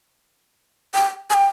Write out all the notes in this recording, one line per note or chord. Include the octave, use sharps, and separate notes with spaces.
G5
G#5
G5